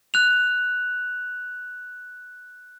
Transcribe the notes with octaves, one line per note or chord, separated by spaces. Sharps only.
F#6 F7